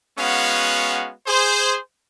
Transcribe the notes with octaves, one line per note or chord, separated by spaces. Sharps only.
G#3 B3 C#4 F#4 F5
G#4 C5